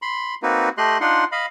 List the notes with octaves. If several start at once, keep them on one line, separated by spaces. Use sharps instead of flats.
B5 C6
A#3 C4 D#4 F#4 B4
A3 G4 D#5 C6 F#6
D4 D#4 F4 F#5 C6
D#5 F5 B5